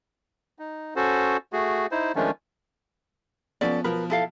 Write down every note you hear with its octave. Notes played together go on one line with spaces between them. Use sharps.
D#4
C#4 F#4 A4 C5
A3 F#4 G#4
D#4 E4 C5
D#3 F3 G#3 A3 C#4 D4
F3 B3 C#4 A4 D5
B2 F3 A#4 B4
E4 A4 F5